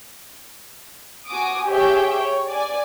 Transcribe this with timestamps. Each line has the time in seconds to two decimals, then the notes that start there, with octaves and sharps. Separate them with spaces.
1.27 F#4 G#5 D6 D#6
1.67 G4 G#4 C#5 E5 G5
2.18 C#5
2.48 D5 G#5